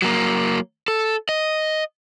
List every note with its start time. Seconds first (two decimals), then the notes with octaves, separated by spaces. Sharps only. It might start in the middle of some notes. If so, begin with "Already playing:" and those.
0.02 F#3 A#3
0.88 A4
1.29 D#5